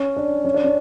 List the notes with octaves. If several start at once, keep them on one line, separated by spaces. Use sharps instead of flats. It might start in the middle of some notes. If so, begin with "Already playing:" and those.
Already playing: C#4
D4
C#4
D4
C#4